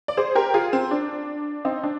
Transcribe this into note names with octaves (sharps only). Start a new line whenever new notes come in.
D5
G#4 C5
G4 A#4
F4 G#4
C4
D4
C4 D#4
D4